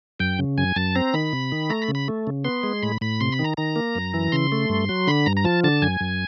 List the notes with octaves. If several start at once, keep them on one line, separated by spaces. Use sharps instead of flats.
F#2 G5
C#3
F#2 G#5
F#2 A5
C4 A#5
D#3 B5
C3
D#3
A3 A#5
B5
C#3
B5
A3
C#3
B3 C6
G#3
A2 B5
A2 B5
C3 C6
B5
D#3
A#5
D#3 A#5
A#3
F#2
E3
C#3 C6
A3
G2
F#3
D3 B5
G2 A#5
A#5
F3 A5
D3 A5
F#2 G#5
F#2